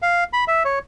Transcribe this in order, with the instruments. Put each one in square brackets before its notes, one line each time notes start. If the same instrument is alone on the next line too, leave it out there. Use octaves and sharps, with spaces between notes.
[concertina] F5
B5
E5
C#5